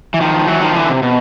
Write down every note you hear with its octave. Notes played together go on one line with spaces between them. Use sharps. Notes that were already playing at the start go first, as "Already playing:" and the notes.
E3
D#3 F3
E3 F#3
D#3 F3
D3 E3
C3
B2